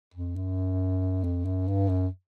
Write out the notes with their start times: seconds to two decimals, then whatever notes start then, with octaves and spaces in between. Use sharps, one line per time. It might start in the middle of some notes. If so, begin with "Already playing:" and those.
0.14 F2
0.36 F#2
1.24 F2
1.45 F#2
1.68 G2
1.89 F#2